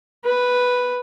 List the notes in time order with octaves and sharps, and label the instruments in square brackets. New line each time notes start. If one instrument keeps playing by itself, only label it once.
[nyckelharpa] B4